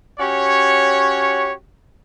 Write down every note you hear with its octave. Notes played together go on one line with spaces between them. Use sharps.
C#4 F#4 G4 C#5